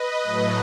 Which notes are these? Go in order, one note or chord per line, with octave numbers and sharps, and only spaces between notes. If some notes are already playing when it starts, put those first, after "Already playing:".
Already playing: B4 D#5
A2 F#3 A3